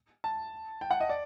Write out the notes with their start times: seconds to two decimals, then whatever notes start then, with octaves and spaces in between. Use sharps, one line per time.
0.24 A5
0.81 G5
0.91 F#5
1.00 D#5
1.09 D5